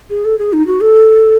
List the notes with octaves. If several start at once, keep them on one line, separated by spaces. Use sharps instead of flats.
G#4
A4
G#4
D#4
F#4
A4